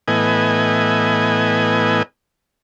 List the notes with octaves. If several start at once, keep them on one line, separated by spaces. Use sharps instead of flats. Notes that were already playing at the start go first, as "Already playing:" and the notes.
A2 E3 B3 D#5 G#5